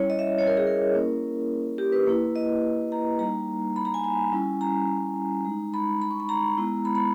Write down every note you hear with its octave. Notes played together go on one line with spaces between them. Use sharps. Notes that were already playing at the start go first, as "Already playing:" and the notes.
Already playing: G3 C#4 E4 C#5
D#5
E5
C#5
A#4
G#4
A#4
A#3 C#4 E4
G4
B4
A#3 E4
D#5
A#5
G3 A#3 D#4 A#5
B5
A#5
G#5
G#5
G3 C#4 E4
A#5
G#3 D#4
B5
B5
C#6
B5
A#5
G#3 B3 E4
B5
B5